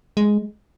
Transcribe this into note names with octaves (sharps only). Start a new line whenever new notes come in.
G#3